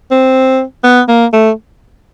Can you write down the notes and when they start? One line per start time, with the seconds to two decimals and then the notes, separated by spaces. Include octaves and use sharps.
0.11 C4
0.84 B3
1.08 A#3
1.33 A3